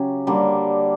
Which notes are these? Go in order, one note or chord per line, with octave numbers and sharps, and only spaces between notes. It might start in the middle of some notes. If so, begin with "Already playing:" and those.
Already playing: C#3 F#3 C#4 G4
D3 G3 A#3